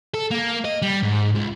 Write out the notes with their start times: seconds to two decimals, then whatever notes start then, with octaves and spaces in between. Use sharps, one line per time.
0.14 A4
0.31 A#3
0.65 D#5
0.82 G3
1.03 G#2
1.35 C#2